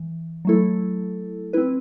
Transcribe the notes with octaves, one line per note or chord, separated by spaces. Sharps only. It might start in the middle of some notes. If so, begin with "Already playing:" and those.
Already playing: E3
F#3 A3 E4 A4
C4 E4 B4